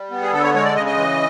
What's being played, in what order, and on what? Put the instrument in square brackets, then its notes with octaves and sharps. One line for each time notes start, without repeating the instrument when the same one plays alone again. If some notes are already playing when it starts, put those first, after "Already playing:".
Already playing: [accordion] G3
B3
G#4
D3 A4
C#5
G#3 C#5
D5
C#3 D#5
D#5
E3